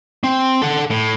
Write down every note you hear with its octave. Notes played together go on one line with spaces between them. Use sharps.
C4
A4 F#5
A2